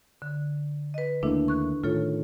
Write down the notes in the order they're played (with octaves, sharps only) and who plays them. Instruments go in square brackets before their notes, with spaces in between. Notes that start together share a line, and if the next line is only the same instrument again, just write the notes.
[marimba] D3
B4 D#5
[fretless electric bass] D#2 A3 A#3 [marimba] D4 E4
[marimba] C#6 F#6
[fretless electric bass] A2 D#3 [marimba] F4 A4 C#5